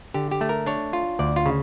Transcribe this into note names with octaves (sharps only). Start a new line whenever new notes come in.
D3 G4
G4
A3
A#4
D4 C#5
F4
D2 D5
F4
C#3